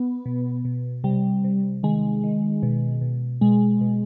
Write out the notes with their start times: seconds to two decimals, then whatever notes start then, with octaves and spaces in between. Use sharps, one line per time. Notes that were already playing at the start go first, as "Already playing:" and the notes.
Already playing: B3
0.26 B2
0.65 B2
1.04 C3 G3
1.44 C3
1.83 D#3 G#3
2.23 D#3
2.63 B2
3.01 B2
3.41 B2 G#3
3.81 B2